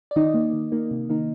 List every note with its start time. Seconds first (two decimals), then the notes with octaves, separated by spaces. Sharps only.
0.11 D5
0.16 D#3 D#4 D#5
0.34 A#3 D#4
0.53 D#3
0.72 A#3 D#4
0.91 C3
1.09 D#3 A#3 D#4